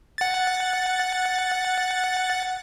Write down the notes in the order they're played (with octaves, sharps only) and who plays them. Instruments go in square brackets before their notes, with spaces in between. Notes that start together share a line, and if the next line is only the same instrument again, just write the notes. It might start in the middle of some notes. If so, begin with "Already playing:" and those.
[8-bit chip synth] F#5 A6